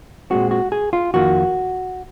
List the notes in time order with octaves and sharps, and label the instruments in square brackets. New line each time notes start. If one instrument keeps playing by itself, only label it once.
[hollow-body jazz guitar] A#2 G#3 C4 F#4
F#4
G#4
F4
F2 D#3 A#3 F4 F#4